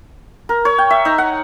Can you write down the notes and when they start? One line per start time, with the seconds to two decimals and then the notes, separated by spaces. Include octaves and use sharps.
0.49 A#4
0.65 C#5
0.78 G5
0.90 E5
1.05 D#4
1.18 F#5